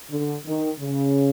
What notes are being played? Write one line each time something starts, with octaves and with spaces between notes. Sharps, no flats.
D3
D#3
C#3